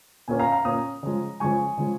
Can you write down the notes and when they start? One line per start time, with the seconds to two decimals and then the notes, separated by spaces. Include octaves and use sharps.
0.28 A#2 A#3 C#4 G#5
0.39 F5 A#5
0.52 F5 A#5
0.65 A#2 A#3 C#4 A#5 D#6
1.03 C#3 F3 G#3
1.40 C#3 F3 G#3 G#5 C#6
1.77 C#3 F3 G#3